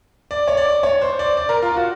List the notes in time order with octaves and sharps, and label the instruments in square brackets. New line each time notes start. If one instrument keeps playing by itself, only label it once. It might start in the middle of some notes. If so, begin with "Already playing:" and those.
[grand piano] D5
C#5
D5
C#5
C5
D5
D5
A#4
F4
F#4